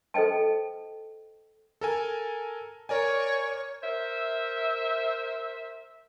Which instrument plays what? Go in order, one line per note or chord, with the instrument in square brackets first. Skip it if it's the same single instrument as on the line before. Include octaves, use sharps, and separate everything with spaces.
[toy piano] A4 C5 D#5 G5 A5
[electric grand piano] A4 A#4 G#5
[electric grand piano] A#4 D5 G#5 [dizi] C#5
[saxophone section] A#4 C5 E5